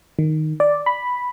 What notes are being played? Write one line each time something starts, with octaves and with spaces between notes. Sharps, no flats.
D#3
D5
B5